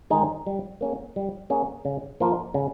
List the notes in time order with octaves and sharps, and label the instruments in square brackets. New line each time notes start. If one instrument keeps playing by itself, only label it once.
[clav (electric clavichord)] D#3 G#3 D#4 G#4
G3
A#3 C#4 G#4
G3
A#3 C#4 G#4
C#3
F3 A#3 F4 A#4
C#3